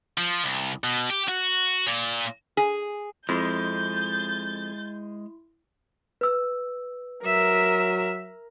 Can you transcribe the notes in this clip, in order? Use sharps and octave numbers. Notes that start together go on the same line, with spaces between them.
F3
C2
B2
G4
F#4
A#2
G#4
F2 G#3 E4 C6 G6 A6
B4 E6
F#3 A#4 E5